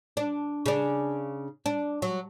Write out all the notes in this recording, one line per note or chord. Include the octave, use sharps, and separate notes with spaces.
D4
C#3 D4
D4
F#3